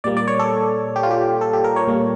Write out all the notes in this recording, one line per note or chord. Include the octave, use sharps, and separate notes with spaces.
A#2 G3 A#3 D5
D5
C#5
A4
G4
F4
G4
A4
G4
A#4
C#5
A#2 G3 A#3